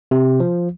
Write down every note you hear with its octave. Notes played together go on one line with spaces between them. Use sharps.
C3
F3